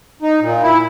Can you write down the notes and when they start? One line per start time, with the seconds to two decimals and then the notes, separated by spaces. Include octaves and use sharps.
0.22 D#4
0.41 A#2
0.63 E4